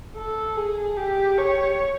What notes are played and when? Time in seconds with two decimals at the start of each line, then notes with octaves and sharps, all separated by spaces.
0.16 A4
0.56 G#4
0.97 G4
1.38 C#5